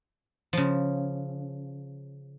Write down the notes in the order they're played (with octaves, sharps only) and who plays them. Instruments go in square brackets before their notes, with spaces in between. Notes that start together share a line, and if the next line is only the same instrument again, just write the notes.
[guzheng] C#3 F3